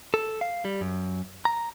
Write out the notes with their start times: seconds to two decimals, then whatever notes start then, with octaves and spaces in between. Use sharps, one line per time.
0.14 A4
0.41 F5
0.65 G3
0.81 F#2
1.45 A#5